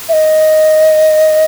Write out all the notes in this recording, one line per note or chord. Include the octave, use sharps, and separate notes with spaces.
E5
D#5